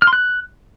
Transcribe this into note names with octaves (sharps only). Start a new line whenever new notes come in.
F6
C6
F#6